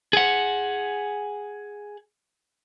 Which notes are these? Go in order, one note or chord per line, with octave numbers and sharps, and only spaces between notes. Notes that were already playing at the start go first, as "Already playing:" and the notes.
G#4 F#5